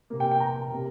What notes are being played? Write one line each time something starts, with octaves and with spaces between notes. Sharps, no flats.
C3 A#3
G5
G5
A#5
C3 A#3